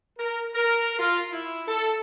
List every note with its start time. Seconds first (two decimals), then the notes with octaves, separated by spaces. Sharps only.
0.17 A#4
0.54 A#4
0.98 F4
1.31 E4
1.68 A4